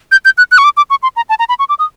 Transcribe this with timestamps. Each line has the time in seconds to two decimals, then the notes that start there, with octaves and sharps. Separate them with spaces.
0.12 G6
0.25 G6
0.38 F#6
0.52 F#6
0.58 C#6
0.64 D6
0.77 D6
0.90 C#6
1.03 C6
1.16 A#5
1.29 A5
1.39 A#5
1.49 B5
1.59 C#6
1.69 D6
1.79 D#6